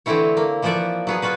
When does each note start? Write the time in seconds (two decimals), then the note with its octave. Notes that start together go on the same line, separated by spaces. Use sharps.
0.06 D3 E3 A3 C4 E4 C#5
0.37 A#3
0.62 E3 F3 F4 F#4 D5 E5
1.07 F#3 B3 G#4
1.22 B3 F4 F#4 B4